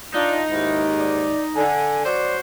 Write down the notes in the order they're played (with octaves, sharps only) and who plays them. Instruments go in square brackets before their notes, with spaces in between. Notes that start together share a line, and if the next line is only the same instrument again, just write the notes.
[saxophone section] D4 [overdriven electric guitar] D#4 [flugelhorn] F4
[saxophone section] D#2 G#2 [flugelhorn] E4
[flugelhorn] D5
[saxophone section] D3 [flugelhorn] G#5
[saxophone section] F#3 C5 [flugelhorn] D5